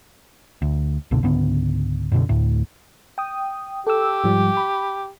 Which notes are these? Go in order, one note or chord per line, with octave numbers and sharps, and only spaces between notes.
D2
G1 C2 B2 D3
C#2 G#2 D3 B3
F#2 B2 D3
D2 A2
G5 D#6
G4 A4 E6
G#2 F3 G3
B5